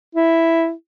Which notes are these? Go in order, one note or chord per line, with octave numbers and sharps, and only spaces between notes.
E4